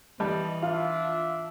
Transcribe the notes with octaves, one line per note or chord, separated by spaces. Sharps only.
E3 G3 D#5 A5
D4 F4 E5 F5